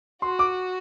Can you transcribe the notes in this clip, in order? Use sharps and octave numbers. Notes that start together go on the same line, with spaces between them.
F#4 C6
D6